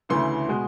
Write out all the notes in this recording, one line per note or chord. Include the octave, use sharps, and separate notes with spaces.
D2 C#3 E3 A3 C6
B2 G#3 B3